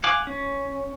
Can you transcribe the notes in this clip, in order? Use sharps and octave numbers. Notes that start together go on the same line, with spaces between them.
F5 F#5 G#5 D6
C#4